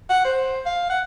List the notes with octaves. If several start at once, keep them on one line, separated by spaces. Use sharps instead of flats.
F#5
C5
F5
F#5